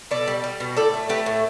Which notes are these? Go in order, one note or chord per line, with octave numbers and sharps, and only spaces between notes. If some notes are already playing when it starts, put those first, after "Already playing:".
B2 A4 D5
G3
G3
B2
A2 A4 D5
A3
A3 G4 B4
A2